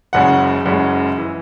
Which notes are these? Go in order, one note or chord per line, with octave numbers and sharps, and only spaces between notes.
F#1 F#2 C#3 G#3 F#5
F#1 F#2 C#3 G#3
E3